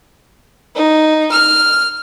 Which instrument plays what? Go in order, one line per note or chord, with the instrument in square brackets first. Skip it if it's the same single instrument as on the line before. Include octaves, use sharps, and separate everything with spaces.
[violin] D#4
F6